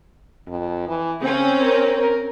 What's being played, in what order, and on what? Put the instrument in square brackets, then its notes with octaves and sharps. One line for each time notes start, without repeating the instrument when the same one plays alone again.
[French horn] F2
E3
[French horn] C#3 [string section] C4 C#4
[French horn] A#4
A#4